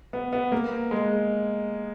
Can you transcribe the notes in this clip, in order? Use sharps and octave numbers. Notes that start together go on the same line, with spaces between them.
B3
B3
A#3
G#3